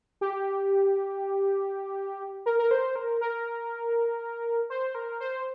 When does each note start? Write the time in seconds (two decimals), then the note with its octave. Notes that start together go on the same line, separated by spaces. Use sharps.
0.21 G4
2.46 A#4
2.59 A#4
2.71 C5
2.96 A#4
3.21 A#4
4.70 C5
4.95 A#4
5.20 C5